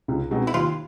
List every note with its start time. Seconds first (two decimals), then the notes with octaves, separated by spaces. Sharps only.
0.08 C#2
0.31 B2 G#3 C4 D#4
0.47 E4
0.54 D#2 F4